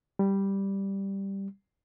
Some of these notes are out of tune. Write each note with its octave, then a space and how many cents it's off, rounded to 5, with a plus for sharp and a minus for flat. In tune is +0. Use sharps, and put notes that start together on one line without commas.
G3 +0